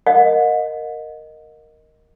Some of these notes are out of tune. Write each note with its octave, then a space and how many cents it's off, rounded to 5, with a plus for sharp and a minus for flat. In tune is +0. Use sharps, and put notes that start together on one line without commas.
A#4 +0 D#5 +0 F#5 -45